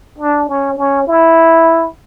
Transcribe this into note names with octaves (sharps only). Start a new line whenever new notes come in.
D4
C#4
C#4
E4